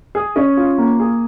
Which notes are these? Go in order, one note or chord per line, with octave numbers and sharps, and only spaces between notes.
G#4
C#4
F4
A#3
G#4